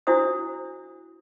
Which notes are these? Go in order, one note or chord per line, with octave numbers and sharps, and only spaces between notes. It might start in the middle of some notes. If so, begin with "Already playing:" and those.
D4 E4 F#4 C5 D#6